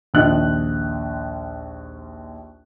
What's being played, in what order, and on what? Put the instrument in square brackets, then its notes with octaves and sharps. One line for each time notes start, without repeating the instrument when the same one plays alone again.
[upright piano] A#1 D#2 D#5 F#6